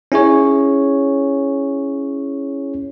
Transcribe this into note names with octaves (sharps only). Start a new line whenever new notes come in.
C#4 E4 G#4 C#5